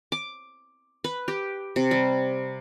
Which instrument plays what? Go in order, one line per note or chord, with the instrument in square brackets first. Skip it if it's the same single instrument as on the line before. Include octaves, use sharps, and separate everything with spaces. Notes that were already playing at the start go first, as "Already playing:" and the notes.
[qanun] D6
B4
G4
C3
G3